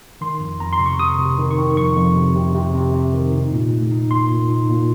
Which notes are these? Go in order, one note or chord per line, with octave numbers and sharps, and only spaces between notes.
D#3 C6
F2
F2 A#5
C6
C3
C#6
C3 D#6
C3
D#3
C#6
D#3
F2 C#6
F2
C3
C3
C3
C3
C3
D#3
D#4
A#2
A3
D#4
A#2 C6
A#2
D#4
A#2